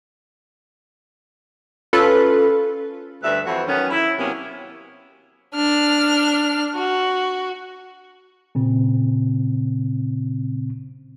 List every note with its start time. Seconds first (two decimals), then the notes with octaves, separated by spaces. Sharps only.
1.93 C#4 F4 A4 B4
3.23 D2 G2 B4 E5
3.46 F2 E3 F#4 C5
3.68 D#3 F#3 B3 C#4
3.91 E4
4.18 C3 F#3 A#3 B3 C#4
5.55 D4 F6
6.75 F#4
8.55 A#2 C#3 C4